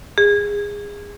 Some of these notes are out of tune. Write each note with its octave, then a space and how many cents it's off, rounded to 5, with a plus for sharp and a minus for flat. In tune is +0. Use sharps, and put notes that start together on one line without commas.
G#4 -20